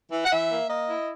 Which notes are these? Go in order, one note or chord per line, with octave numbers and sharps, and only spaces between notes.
E3
F#5
E3 E5
A#3
A#3 D#5
E4